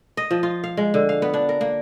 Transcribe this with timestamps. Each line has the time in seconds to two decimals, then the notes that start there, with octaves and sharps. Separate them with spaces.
0.17 D#5
0.31 F3
0.43 F4
0.64 F5
0.77 G#3
0.94 D3
1.09 F5
1.22 B3
1.34 D4
1.49 A#4
1.61 A#3